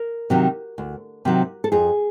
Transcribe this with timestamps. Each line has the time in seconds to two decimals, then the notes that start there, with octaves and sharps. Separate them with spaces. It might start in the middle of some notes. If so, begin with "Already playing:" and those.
Already playing: A#4
0.30 C3 D#3 F#3
0.78 D2
1.25 C3 D#3 F#3
1.64 A4
1.72 F2 G#4